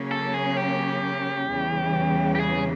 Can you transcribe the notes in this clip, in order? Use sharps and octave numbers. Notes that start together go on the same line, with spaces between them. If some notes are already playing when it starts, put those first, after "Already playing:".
Already playing: C#3 F#3 A#3 C#4
A4
G#4
G4
E2 C#3 E3 G3
G4
G#4